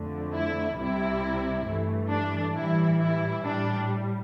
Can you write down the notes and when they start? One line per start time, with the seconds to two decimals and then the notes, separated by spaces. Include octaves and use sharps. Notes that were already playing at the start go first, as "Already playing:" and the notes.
Already playing: F2 D3 A3
0.33 E4
0.77 C2 C3 G3 E4
1.66 G2 E3 A3
2.10 D4
2.55 A2 E3 G3 E4
3.00 E4
3.44 A2 G3 D4